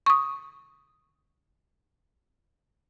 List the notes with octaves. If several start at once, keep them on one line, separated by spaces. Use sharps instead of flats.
C#6 D#6